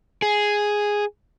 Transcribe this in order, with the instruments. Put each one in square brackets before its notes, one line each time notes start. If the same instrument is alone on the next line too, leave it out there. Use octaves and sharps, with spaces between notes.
[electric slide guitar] G#4